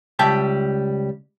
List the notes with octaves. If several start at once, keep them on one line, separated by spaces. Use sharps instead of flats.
C#2 G3 E5 G5 A5